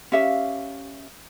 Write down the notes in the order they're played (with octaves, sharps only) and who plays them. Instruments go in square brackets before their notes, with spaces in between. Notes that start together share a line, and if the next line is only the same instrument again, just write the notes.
[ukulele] C#4 G4 E5 F5